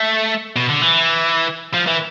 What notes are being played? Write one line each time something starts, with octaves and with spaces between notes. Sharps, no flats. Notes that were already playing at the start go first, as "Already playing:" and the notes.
Already playing: A3
B2
D3
E3
F3
E3